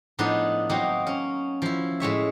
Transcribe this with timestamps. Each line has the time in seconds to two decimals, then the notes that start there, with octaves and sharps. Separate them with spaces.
0.19 A2 F3 B3 D4 D#4
0.69 F#3 A#3 C4 D#4
1.07 C#4
1.62 F3 E4
2.00 A2 G#3 C#5 E5